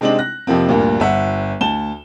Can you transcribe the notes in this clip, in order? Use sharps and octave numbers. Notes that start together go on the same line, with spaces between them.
C3 G#3 C4 D4 D#4 F#7
F#6 A#6
F2 C3 F3 A#3 C4
D2 G2 A#2 A#3
G1 E5 F#5
D2 A5 E7 G7